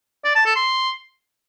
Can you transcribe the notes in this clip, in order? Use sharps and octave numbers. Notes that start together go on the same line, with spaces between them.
D5
A5
A4
C6